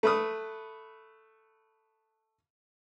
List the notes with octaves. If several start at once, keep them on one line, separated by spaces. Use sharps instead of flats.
A3 B4 D#6